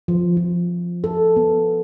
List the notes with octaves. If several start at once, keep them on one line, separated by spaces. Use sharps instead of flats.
F3
F3
A4
B3